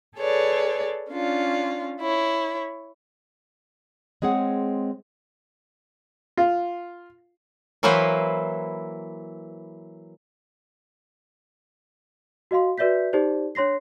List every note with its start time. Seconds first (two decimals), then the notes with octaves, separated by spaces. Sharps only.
0.17 G#4 A4 B4 C#5 D5
1.09 C#4 D4 F4
2.01 E4 C#5
4.22 G#3 C4 G#4 C#5 F#5
6.37 F4
7.83 E3 F#3 A#3 E4 B4 C5
12.51 F#4 D#5 F5 C6
12.78 F#4 B4 D5 E5 G6 B6
13.13 D#4 G4 A4 C5 D5
13.55 D4 C#5 C6 A#6 C7